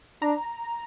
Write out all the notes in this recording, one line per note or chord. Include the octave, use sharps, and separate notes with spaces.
D4 A#5